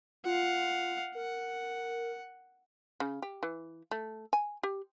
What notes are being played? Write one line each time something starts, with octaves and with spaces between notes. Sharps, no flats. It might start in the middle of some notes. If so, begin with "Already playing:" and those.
F4 F5 F#5
A#4 F#5
C#3
G4
E3
A3
G#5
G4